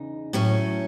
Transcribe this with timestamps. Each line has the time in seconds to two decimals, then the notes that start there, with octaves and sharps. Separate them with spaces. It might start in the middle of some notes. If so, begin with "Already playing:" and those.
Already playing: E2 C#3 D#4
0.33 A2 F#3 C#4